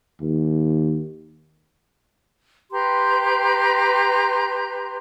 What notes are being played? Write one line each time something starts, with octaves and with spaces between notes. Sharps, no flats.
D#2
G4 B4 A#5 C6